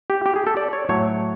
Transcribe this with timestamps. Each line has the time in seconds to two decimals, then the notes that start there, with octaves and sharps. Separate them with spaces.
0.10 G4
0.26 G4
0.36 G#4
0.47 A4
0.57 D5
0.73 C#5
0.89 A2 F#3 A3 C#5